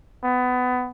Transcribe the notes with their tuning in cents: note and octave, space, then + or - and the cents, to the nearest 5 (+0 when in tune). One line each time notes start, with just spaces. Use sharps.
B3 +20